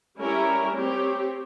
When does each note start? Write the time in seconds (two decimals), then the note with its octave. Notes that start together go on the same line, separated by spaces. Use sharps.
0.18 G3 C#4 E4 A#4 C#5
0.75 C4 G4 C#5